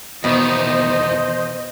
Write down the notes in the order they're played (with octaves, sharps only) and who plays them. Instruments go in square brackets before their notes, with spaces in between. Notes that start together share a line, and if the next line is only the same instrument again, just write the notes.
[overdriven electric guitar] E2 D#3 [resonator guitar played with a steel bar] B2 [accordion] C5 [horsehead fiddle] D#5